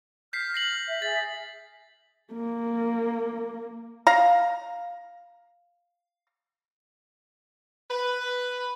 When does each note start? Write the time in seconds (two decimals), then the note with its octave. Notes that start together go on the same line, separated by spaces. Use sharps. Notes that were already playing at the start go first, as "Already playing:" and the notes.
0.33 F6 G6 B6 C7
0.54 A#6 C7 F#7
0.89 E5
1.02 G#4 E5 A6
2.33 A#3
4.07 F5 A#5
7.91 B4